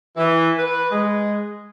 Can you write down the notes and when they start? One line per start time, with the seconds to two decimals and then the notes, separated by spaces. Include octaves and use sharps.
0.17 E3
0.58 B4
0.91 G#3